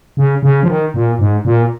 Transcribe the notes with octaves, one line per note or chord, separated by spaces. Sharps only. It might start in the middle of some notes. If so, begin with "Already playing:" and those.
C#3
C#3
F3
D#3
A#2
G#2
A#2